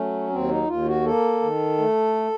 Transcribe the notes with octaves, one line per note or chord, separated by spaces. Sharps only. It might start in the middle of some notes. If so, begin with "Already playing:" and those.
Already playing: F#3 A3 C#4
D#2 C4
D#4
D#2 F4
F#4
A#3 A4
D#3
A3